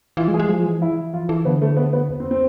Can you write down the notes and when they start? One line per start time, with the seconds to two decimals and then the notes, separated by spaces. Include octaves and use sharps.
0.17 E3 F4
0.28 G#3
0.34 G#4
0.39 G#3
0.49 F3
0.66 E3
0.82 E4
1.13 F3 F4
1.29 E3 A4
1.45 D3 B3
1.62 A3
1.77 B3
1.93 B3
2.09 E2
2.20 C4
2.31 C4